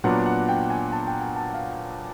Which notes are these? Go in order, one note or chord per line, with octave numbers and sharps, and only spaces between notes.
A#2 F#3 B3 D4 F#5
F#5
G5
G#5
A5
G5
G#5
A5
F5